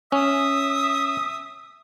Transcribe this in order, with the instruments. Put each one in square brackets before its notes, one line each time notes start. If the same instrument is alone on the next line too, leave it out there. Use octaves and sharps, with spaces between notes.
[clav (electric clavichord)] C#4 [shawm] E5 [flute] D#6